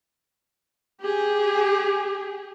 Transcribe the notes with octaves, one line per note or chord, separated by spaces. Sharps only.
G4 G#4